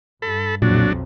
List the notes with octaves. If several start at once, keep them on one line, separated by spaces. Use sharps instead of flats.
G2 A4 B5
B1 F2 A#2 F#3 D4